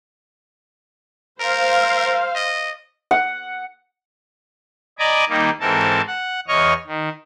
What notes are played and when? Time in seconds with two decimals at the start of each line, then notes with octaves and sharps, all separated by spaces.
1.40 A#4 C5 F5
2.35 D#5
3.11 F#5
4.99 D5 D#5 G#5 A#5 B5 D6
5.29 D#3 G3 A#3 D#4
5.60 G#2 E3 C4 A4 A#4 A5
6.07 F#5
6.48 E2 C#5 D#5 C#6 F6
6.87 D#3